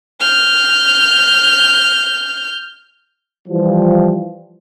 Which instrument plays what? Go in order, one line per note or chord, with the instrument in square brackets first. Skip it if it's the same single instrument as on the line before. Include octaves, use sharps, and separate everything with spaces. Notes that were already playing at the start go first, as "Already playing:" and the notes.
[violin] F6 G6
[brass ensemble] E3 F3 G3